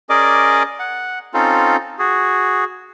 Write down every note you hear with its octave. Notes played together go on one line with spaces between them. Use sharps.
C#4 G#4 A#4 D5 D#5 D6
F#5
C4 C#4 D#4 F4 A4
F#4 G#4